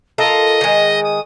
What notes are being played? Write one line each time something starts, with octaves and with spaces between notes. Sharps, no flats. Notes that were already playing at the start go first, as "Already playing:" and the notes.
F4 A4 A#4 D#5
D#3 G#3
D#6